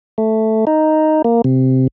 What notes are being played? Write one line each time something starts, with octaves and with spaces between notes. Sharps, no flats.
A3
D#4
A#3
C3